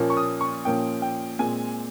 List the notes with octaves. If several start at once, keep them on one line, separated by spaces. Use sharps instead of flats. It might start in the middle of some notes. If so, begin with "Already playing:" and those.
Already playing: A#2 F3 A#3 C#4
C#6
D#6
C#6
A#2 F3 A#3 C#4 G5
G5
A#2 G#3 C4 G#5